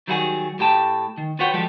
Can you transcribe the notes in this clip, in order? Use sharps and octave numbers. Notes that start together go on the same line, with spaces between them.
D#3 F#3 G3 E4 F#4 G#4
A2 G4 G5 A5
D#3
F4 F#4 B4 C#5 F#5 G5
F3 G3 G#3 G4 A4